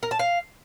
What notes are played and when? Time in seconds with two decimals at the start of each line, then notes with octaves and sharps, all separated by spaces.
0.03 A#4
0.11 A5
0.19 F5